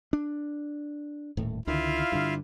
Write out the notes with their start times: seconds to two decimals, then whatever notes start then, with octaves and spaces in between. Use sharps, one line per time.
0.13 D4
1.37 D#1 A2
1.67 C#2 D3 D#3 E4 F4 F5
2.12 G2 D3